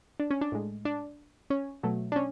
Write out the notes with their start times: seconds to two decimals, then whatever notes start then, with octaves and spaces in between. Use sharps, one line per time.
0.20 D4
0.31 C#4
0.41 D4
0.52 A2 G#3
0.85 D4
1.50 C#4
1.83 B2 F#3 A3
2.12 D4
2.16 C#4